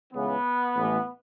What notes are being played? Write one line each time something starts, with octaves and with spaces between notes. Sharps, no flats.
C#2 C#3 E3 B3
A1 A2 E3